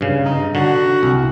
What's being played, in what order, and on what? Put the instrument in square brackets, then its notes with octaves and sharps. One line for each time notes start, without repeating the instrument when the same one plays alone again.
[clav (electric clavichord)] G2 C#3
[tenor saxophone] D#4
[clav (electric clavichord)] D3 [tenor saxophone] F#4
[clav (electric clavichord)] C2